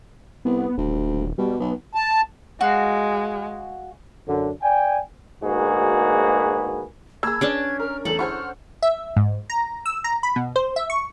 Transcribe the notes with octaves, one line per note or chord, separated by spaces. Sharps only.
C2 B3
D#1 D2
B2 G3
B1 B3
A5
G#3 F#4 F5
F#2 D3
D5 G5 G#5
D2 G#2 A#3 F#4 G#4 B4
A#3 G#4 A5 B5 E6 G#6
C#4 D4 G#4 B4 D5 A5 D7
A#4 F6
E2 A3 A4 F#7
E4 G4 G#4 C5 F#5 C#6 F6
E5
G#2
A#5
E6
A#5
B5
B2
C5
E5
C#6